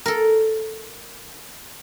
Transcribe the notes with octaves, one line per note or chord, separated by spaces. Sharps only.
A4 A#4